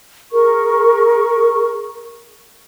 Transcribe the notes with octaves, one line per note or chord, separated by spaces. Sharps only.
G#4 A#4 C#6